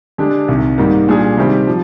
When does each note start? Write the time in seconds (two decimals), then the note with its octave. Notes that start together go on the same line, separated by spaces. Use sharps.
0.18 D3 G#3 D4 G4
0.48 C2 C3 D#3
0.78 G#2 D#3 G3 A#3
1.08 A#2 G3 D4 G#4
1.37 C3 D#3 G3 C4 G4
1.67 F3